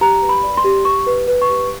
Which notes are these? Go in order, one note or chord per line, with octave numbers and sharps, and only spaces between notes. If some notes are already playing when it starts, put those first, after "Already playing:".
G4 A#5
B4
B5
D5
C6
G4
G4 C#6
B4
B4
C#6
G4